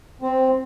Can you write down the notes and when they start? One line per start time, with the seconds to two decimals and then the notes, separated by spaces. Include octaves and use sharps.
0.22 C4